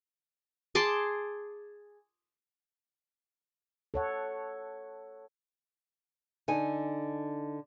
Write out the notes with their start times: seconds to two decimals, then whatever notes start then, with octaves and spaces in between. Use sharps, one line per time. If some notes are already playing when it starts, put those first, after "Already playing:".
0.75 G#4 A5 C6 D6
3.94 A4 C#5 F#5
6.48 D3 D#4 G#5